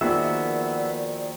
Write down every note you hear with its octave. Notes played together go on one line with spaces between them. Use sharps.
D#3 F3 A#3 B3 F#4 G#4 D5 E5